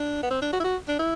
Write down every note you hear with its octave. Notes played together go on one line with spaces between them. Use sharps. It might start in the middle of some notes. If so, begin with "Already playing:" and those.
Already playing: D4
B3
C4
D4
F#4
E4
F#4
D4
E4